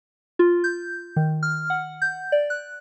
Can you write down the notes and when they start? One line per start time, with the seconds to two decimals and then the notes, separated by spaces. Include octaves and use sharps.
0.39 F4
0.64 G6
1.16 D#3
1.43 F6
1.70 F#5
2.02 G6
2.32 D5
2.50 F#6